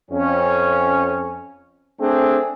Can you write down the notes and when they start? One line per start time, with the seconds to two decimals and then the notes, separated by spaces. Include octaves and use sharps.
0.11 F2 C#4
2.00 A3 C4 D4 G#4